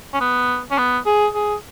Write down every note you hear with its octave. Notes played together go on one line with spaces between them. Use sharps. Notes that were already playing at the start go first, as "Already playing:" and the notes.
C#4
B3
C#4
B3
G#4
G#4